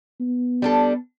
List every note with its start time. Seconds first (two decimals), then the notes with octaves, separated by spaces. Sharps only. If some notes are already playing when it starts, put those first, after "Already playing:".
0.20 B3
0.62 G3 D4 A4